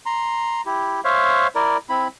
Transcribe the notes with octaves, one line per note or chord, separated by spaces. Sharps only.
A#5 C6
E4 G4
C5 C#5 E5 F5
E4 A#4 D5
C4 E4 B5